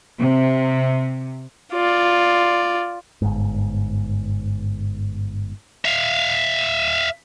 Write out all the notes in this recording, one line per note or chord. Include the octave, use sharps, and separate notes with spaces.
C3
F4 D5
G1 G#2
E5 F5